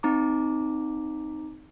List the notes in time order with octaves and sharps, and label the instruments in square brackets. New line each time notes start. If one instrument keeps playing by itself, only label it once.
[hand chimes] C4 D#4 A#5 D6